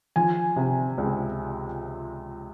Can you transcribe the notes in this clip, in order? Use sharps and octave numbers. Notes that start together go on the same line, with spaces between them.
F3 G#5
C3
C#2